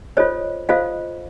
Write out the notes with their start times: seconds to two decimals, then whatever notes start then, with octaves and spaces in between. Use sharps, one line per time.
0.17 F4 A4 C5 C#5 D#5
0.69 F4 A4 C5 D#5 F5